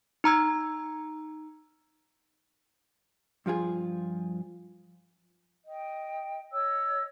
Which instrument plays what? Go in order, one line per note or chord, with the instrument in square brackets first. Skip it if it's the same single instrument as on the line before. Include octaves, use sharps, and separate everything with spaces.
[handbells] D#4 A#5 E6 G#6
[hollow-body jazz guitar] G2 F3 F4 G#4
[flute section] D#5 G5
C#5 D#5 E6